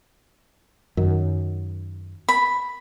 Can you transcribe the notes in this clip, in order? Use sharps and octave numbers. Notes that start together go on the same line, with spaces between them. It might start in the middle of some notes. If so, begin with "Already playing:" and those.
F#2 D#3
B5